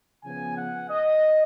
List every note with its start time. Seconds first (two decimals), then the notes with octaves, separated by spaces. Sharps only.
0.25 C#3 F3 B3 G#5
0.58 F#5
0.91 D#5